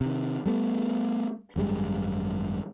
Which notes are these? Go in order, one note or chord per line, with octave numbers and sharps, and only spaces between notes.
C3 D#3
G3 A3 B3
G#1 F#2 G3 G#3